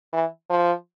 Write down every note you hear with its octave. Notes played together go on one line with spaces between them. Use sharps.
E3
F3